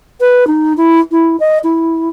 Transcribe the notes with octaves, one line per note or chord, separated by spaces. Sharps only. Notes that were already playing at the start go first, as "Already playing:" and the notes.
B4
D#4
E4
E4
D#5
E4